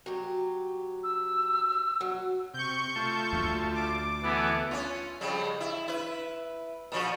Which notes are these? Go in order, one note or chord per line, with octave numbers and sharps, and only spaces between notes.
F#3 G4
E6
F#3
C3 C#6 G6
A3 F4 A5
D2
D6
E3 B3 A4 F#5
C#4 F4
F2 C#3 G3
E4
E4 B4
A#2 F3 F#4